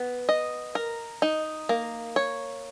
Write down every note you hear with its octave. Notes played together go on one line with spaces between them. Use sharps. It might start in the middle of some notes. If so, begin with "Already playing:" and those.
Already playing: B3
D#5
A#4
D#4
A#3
C#5